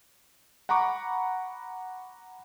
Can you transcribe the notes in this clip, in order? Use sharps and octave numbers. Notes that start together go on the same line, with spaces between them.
F#5 A#5 B5 C#6 D6